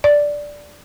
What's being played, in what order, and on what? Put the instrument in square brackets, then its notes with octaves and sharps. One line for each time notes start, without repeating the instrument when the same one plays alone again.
[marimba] D5